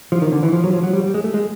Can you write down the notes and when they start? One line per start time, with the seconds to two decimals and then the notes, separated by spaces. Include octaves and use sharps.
0.12 F3
0.22 D#3
0.32 D3
0.43 E3
0.52 F3
0.64 F#3
0.73 F3
0.83 F#3
0.93 G3
1.04 G3
1.14 G#3
1.24 A3
1.34 G#3